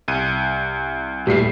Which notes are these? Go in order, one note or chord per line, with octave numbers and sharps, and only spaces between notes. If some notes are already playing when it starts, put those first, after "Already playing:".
C2 D#7
A#2 G3 A3 B6 C7